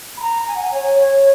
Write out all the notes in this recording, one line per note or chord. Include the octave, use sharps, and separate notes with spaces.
B5
A#5
G#5
F#5
G#5
C#5
C#5